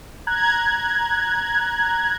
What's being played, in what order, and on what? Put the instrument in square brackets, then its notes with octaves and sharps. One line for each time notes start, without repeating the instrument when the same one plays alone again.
[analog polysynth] A#5 F#6 G#6